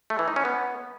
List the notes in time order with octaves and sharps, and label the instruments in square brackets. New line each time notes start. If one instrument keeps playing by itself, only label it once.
[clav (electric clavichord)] A3
E3
D#4
C#4
B3